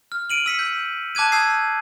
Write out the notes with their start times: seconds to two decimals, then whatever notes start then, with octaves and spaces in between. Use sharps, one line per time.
0.12 F6
0.30 D7 D#7 F#7
0.46 E6 B6 C#7
0.59 G6
1.15 A5 D6 F#6 G#6 D#7
1.32 A5 D#6 E6 G6 G#6 C7